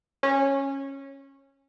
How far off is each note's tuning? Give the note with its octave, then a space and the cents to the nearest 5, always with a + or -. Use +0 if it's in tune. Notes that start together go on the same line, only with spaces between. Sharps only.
C#4 -15